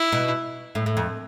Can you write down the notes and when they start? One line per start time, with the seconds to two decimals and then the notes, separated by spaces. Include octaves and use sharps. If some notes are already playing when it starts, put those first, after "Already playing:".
Already playing: E4
0.12 B2
0.75 A2
0.86 A2
0.97 F2